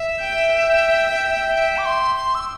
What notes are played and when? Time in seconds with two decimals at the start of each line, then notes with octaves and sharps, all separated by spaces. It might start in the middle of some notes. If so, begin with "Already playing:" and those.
Already playing: E5
0.20 G5
0.66 G5
1.55 E5
1.77 D6
1.86 C6
2.16 C6
2.35 E6